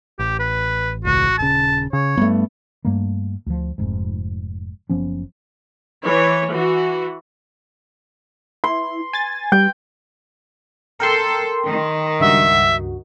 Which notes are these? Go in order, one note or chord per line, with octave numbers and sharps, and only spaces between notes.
A1 G4
B4
E1 C#2 F#4
D#1 C#3 A5
C#3 C#5
G2 A3 B3
G2 G3 A3 A#3
D2 F3
F1 G#2
F#1 F3 B3 C#4
E3 C#5
E3 F#4
E4 C6
G#5 A6
G3 G5
A4 A#4 G5 C6
D#3
C#2 G2 F#4 E5